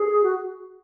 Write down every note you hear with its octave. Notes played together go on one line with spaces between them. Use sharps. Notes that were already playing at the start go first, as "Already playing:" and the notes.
Already playing: G#4
F#4